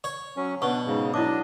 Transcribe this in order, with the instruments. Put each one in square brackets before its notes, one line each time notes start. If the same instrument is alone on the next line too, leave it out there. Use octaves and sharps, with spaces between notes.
[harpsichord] C#5
[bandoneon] F#3 C#4
[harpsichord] B2 [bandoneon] D4 [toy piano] C#6
[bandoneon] G#2 C#3
[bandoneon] F#3 D4 D#5 [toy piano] E4 D6